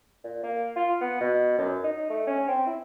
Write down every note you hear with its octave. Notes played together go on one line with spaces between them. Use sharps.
A#2
A#3
F4
B3
B2
F#2
D#4
A3
C#4
C4
E4